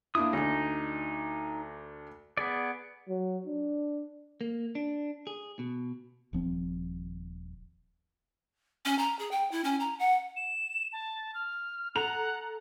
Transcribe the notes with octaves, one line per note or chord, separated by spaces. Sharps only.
A#3 D4 E4 D#6
D2 D4 D#4
B3 G#4 D5
F#3
D4
A#3
D4
G#4
B2
D#1 F3 C4
C#4
A#5
G#4
G5
E4
C#4
A#5
F#5
E7
A5
F6
A4 F#5 A#5 F7